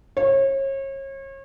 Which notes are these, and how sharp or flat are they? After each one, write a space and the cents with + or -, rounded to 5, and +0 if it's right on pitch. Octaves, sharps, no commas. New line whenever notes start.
C#5 -35